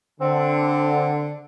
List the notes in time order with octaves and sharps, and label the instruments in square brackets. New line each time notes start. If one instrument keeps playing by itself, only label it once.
[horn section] D3 [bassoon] C4